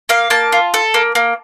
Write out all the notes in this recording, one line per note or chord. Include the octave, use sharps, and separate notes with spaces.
A#3 F5
A#3 A5
F4
A4
A#3
A#3